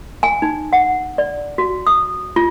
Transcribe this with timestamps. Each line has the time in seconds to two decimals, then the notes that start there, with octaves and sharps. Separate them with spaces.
0.23 G#5
0.42 D#4
0.73 F#5
1.18 D5
1.58 F#4
1.87 D#6
2.36 F4